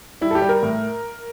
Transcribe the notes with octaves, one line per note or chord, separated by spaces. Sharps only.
G3 E4
A4
G4
G3
A#4
A2